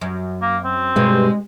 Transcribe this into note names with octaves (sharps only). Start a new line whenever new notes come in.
F#2
A#3
C4
G2 B2 G#3